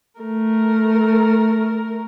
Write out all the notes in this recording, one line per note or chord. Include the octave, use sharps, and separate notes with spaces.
A3 A#4